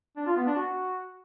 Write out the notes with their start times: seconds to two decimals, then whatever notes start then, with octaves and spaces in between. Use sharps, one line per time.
0.17 D4
0.26 F4
0.36 B3
0.46 D4
0.56 F#4